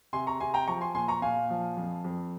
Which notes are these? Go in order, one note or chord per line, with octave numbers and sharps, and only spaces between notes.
C3 G#5 C6
A#5 C#6
C3 G#5 C6
G5 A#5
F3 A#5 C#6
G#5 C6
A#2 G#5 C6
A#5 C#6
A#2 F5 G#5
F3
F2
F2